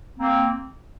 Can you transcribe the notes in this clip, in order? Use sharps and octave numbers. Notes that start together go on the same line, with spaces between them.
A#3 C4